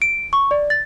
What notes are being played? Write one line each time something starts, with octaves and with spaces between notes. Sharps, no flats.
D7
C#6
D5
A6